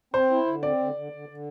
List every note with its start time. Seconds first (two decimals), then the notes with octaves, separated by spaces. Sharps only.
0.14 C4 C5
0.30 E4
0.47 D3
0.63 C4 D5
0.79 D3
0.95 D3
1.12 D3
1.29 D3